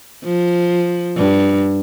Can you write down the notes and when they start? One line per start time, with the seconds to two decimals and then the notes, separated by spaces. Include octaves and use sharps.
0.24 F3
1.17 G2